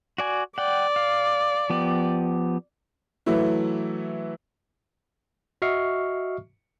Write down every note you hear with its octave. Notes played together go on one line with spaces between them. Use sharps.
F#4 D5 G#5
D5 F#5 G5
F5
F3 B3 G4
E3 F#3 A3 E4
F#4 D#5 E5 C#6 F6 C7